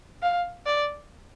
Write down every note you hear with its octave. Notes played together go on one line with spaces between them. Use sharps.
F5
D5